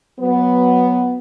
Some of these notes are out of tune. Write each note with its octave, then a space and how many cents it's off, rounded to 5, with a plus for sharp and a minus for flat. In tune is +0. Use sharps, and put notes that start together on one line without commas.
F#3 -5 B3 +0